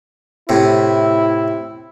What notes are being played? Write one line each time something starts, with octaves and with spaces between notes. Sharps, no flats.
A2 C3 E4